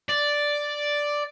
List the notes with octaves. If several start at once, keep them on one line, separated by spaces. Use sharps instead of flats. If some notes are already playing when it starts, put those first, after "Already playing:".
D5